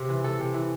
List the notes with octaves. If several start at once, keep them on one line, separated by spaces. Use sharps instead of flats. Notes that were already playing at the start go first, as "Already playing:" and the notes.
Already playing: C3
E3
E3 A4
C3
E3